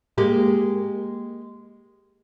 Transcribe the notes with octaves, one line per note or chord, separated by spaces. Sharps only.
G#3 A#3 G4